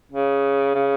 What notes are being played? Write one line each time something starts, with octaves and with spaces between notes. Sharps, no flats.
C#3
C#3